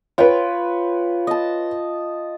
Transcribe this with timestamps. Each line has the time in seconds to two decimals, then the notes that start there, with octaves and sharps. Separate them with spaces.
0.18 F4 B4 C#5 G5
1.27 D#5 A5